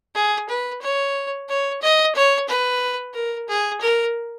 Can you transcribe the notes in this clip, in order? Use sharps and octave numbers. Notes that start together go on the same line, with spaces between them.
G#4
B4
C#5
C#5
D#5
C#5
B4
A#4
G#4
A#4